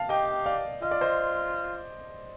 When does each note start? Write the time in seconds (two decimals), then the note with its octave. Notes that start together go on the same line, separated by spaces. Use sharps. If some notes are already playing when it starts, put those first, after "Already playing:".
Already playing: F5 A5
0.09 G4 D#5 G5
0.46 D5 F5
0.82 F4 D#5
0.91 D5
1.01 C5 D#5